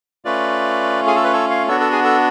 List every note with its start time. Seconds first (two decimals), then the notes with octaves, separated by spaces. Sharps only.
0.25 A3 C#4 F4 B4 D5
1.07 G#4
1.15 A4
1.24 B4
1.33 A4 C#5
1.50 C#5 F5
1.68 B3 D4 F#4 A4 C#5
1.80 A4
1.92 G#4
2.04 A4